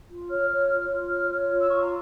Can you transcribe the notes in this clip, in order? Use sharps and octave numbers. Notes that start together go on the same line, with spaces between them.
F4
C#5 F6
C#5
F4
F4
C#5 F6
C#5
F4
E6
F4 C#6
A#5